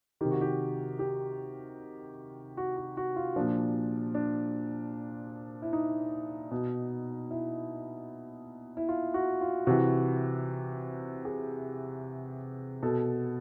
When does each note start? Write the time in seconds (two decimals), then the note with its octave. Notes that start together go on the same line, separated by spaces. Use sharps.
0.21 C3 D#3 G4
0.31 F#4
0.41 G4
0.99 G4
2.57 F#4
2.77 F#4
2.97 F#4
3.16 F4
3.36 A#2 F3 D4
4.14 D4
5.62 E4
5.73 D#4
6.51 B2
7.31 E4
8.77 E4
8.89 F4
9.14 F#4
9.41 F4
9.67 C3 E3 F#4
11.25 G#4
12.83 B2 A4